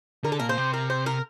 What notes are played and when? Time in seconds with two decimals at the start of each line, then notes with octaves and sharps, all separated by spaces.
0.24 D3 A#4
0.32 A4
0.40 A#2 A#4
0.49 C5
0.57 C3
0.74 A#4
0.90 C5
1.06 A#4